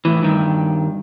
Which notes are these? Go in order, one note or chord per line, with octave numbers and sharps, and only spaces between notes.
A2 E3
G2 D#3